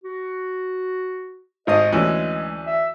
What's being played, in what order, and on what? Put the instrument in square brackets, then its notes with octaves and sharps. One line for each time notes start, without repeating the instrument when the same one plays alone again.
[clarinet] F#4
[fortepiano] G#1 C5 D#6 [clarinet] D#5
[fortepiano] D2 E3 C#4 [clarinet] G#3
[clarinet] E5